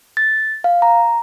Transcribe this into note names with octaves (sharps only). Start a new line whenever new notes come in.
A6
F5
A#5